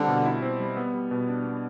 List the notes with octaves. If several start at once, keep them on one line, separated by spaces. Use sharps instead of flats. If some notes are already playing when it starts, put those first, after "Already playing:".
Already playing: D3 G3 C4
B2
E4
C4
G3
B3
G3
B2
D4
B3